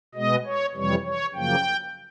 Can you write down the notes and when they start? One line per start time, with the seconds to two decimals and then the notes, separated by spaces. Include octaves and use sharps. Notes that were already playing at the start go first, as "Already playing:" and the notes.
0.15 B2 G#3 B3 D#5
0.45 C#5
0.74 F2 C3 E3 G3 C#5
1.05 C#5
1.34 F#2 C#3 F3 A#3 G5